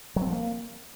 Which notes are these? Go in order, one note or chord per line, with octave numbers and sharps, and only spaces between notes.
F#3
C4
F3
A#3